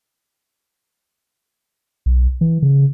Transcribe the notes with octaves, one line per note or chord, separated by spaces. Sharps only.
B1
E3
C#3